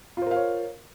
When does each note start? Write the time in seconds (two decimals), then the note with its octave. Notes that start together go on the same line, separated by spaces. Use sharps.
0.17 F4
0.22 C5
0.26 A#4
0.31 F5
0.36 C#5